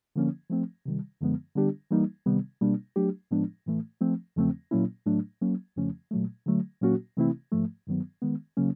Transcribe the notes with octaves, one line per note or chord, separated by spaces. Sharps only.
D3 F3 A#3 C#4
F3 A3 C4
C3 D#3 G3
F#2 D3 F3 G#3 B3
D3 G3 B3 D4 G4
E3 G3 A#3 D#4
C3 D#3 G3 B3
B2 G3 A#3 D4
F#3 A3 D4 G4
A2 F3 G#3 B3 D4
A2 E3 A3
F3 A3 C4
E2 C#3 F3 A3 C4
A#2 F#3 A#3 C#4 E4
A2 F#3 A3 D4
F#3 A#3 C#4
F2 C#3 F3 A3 C#4
A#2 F#3 A3
D3 F#3 A3
A#2 F#3 A#3 C#4 F#4
C3 E3 A3 C4 E4
G#2 F3 A3
G2 D#3 F#3 B3
D#3 G#3 B3
C#3 F#3 A#3 C#4